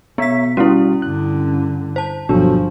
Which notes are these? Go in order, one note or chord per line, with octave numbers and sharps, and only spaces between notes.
B2 B3 C#5 E5 B6
G3 C#4 E4 F#4 F5
G2 D3 F#6
C5 A5
G1 B2 F3 F#3 D4 A4